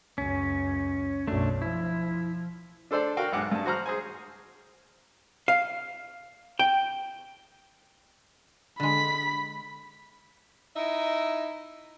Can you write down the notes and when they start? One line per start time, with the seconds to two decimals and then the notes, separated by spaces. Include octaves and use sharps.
0.18 C#2 F#2 C#4
1.27 B1 F#2 A3 D4
1.62 F3 E4
2.91 D4 A4 C5 D5
3.17 F#4 A#4 F5 G5
3.32 B1 G#2 F#5 D6
3.51 G2 A5
3.66 F#4 C5 A#5 F6
3.86 G#4 C5 G#5
5.48 F5
6.59 G5
8.80 D3 G#3 B5 B6
10.76 D#4 E4 D#5 E5